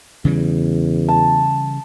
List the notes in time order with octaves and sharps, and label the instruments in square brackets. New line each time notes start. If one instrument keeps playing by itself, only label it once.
[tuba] E2 [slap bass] C#3 E3 G3
[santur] A5